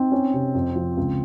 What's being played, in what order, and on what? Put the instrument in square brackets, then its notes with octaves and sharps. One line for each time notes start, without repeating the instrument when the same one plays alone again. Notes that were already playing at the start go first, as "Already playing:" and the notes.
Already playing: [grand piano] C4 [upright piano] D#4
[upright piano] C#4
C3
F2
F3
C#2